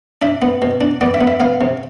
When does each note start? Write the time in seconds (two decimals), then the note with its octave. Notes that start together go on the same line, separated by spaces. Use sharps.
0.22 D4 E5
0.42 B3
0.62 B2
0.81 D4
1.01 B3 D5
1.14 E5
1.21 B3
1.27 E5
1.40 B3 F5
1.61 C3